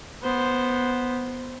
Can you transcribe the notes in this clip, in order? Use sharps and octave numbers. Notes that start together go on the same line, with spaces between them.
B3 C5